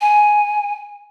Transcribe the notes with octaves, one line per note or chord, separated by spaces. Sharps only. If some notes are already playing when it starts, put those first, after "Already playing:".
G#5